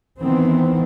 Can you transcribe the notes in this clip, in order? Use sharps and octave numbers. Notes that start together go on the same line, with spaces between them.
D#3 E3 B3 C4